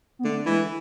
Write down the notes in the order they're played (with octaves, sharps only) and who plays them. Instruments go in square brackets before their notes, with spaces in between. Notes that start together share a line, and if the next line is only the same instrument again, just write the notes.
[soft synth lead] B3
[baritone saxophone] D3 [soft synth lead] A3
[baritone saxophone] E3 [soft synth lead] G#3